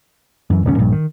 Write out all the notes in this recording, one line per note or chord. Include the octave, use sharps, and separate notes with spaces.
F#2 E3
D#1 C#2 C#4
A#1 G2
D#3